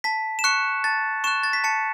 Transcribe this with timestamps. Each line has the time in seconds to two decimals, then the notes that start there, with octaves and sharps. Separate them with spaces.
0.04 A5 B6
0.39 E7
0.44 C#6 F#6 C#7
0.84 A5 A6
1.24 C#6 F#6 E7
1.43 A6
1.53 B6
1.64 A5 C#7